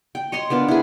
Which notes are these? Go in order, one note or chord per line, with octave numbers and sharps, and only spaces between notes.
G5
C#5 D#5 A#5 C6
B3 D4 F4 A#4
E4 G#4